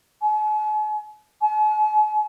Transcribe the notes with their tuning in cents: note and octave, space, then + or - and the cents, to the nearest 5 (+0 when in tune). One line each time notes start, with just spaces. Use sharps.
G#5 +45
G#5 +45